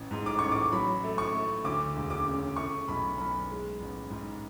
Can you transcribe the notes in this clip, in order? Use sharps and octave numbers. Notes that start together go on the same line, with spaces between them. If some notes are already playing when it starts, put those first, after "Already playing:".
Already playing: A1
G#2
D6
A1 C#6
D6
F#3 B5
A3
C#6
A3
D2 D6
E1
D6
C#3
A3 C#6
B1 B5
B1 B5
G#3
A1
G#2